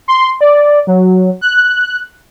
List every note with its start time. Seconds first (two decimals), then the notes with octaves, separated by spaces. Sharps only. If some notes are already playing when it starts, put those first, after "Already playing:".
0.08 C6
0.41 D5
0.87 F#3
1.41 F#6